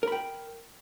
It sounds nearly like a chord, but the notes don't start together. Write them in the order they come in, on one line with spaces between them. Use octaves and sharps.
A#4 B5 G5